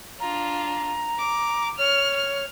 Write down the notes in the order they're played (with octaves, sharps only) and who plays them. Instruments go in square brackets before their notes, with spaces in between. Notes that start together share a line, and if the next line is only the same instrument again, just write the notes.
[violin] D4 F4 [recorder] A#5
[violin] D6
[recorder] C#5 [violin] F6
[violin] F6